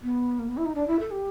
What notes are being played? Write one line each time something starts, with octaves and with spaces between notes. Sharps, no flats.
B3
A#3
B3
E4
D#4
D4
E4
A4
G4